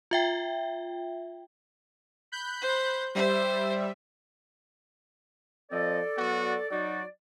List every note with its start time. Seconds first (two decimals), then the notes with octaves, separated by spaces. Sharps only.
0.11 F4 E5 G5
2.32 B5 F#6 G6
2.62 C5
3.15 G3 C5 E5
5.72 F3 C4 A4 D5 D#5
6.17 F#3 B3 F#4
6.70 F#3 D#4 F#4 D5